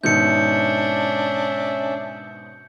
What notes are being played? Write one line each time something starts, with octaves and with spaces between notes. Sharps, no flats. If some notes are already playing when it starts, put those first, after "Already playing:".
G#2 B2 D#3 C#4 D4 E5 G6 C#7